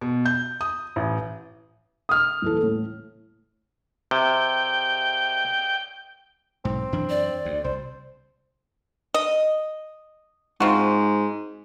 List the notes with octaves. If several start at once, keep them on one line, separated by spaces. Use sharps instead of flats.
B2
G6
D#6
A1
D#6 F6
D#1 E3 A4
A2
C3 G5
B1 G#2 C4
F#2 E3 D4
D5
D2
C2 C5
D#5
G#2 C4 F4 F#4